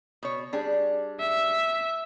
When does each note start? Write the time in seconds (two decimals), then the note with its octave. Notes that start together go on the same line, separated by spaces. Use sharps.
0.23 B2 C#5
0.53 G3 D4 G#4
1.20 E5